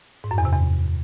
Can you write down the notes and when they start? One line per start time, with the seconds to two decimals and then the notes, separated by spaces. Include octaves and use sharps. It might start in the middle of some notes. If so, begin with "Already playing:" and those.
0.24 G#2
0.31 F#2
0.38 E2
0.45 C3
0.52 E2